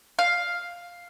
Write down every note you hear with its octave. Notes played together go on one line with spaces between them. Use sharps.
F5